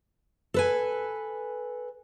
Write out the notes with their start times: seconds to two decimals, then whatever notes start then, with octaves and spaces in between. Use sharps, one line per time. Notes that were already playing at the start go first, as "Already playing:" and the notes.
0.54 A4 B4 G#5